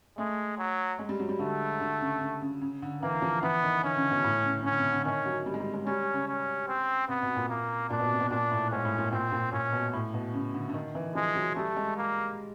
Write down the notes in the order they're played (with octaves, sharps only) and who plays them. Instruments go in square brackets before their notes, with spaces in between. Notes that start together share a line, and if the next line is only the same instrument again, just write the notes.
[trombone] G#3 [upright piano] A3
[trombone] F#3
[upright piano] G#3
G3
F#3
G3
[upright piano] D3 [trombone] A3
[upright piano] D3
C#3
C#3
C#3
C#3
D3
[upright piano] E3 [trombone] A#3
[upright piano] F3
[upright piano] E3 [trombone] B3
[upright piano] D#3
[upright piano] D3 [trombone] C#4
[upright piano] C#3
B2
A2
C#3
C#3
[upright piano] D3 [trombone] C#4
[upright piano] C3
D3
[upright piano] D#3 [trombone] C#4
[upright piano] F#3
G3
G#3
G3
G#3
[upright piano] G3 [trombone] C#4
[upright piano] C#3
[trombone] C#4
C4
[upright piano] C3 [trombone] B3
[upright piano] B2
A#2
[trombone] A#3
[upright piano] A#2 [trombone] D4
[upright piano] B2
C3
B2
[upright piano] A#2 [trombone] D4
[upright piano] A2
[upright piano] G#2 [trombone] C#4
[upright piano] A2
A#2
[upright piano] A#2 [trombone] C4
[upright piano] A#2
[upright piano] A#2 [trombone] C#4
[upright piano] B2
A2
B2
C#3
D3
D3
D#3
E3
[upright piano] F3 [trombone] G#3
[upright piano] F#3
[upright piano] G3 [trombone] A3
[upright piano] G#3
[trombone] A#3